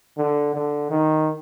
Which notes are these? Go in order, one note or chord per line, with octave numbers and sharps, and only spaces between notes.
D3
D3
D#3